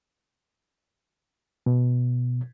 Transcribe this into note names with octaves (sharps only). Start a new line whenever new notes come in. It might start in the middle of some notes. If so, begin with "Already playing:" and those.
B2